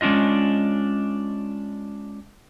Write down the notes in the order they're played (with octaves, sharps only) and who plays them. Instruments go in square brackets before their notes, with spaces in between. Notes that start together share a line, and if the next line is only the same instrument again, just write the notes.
[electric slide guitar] G#3 C#4 D4 F4 D#5